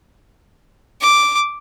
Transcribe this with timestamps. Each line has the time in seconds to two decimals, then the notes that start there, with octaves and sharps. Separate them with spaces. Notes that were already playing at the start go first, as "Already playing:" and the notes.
1.01 D6